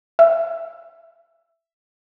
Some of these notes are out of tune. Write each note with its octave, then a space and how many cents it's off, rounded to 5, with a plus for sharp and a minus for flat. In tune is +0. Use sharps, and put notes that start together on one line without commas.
E5 +10